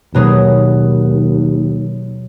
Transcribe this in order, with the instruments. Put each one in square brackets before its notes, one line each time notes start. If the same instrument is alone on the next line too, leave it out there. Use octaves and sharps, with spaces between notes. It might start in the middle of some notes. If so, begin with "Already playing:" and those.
[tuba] D#2 [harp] B2 F#3 G#4